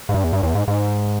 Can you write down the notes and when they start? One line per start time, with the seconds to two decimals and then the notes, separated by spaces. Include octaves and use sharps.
0.09 G#2
0.14 G2
0.24 E2
0.33 G2
0.43 E2
0.55 G#2
0.68 G#2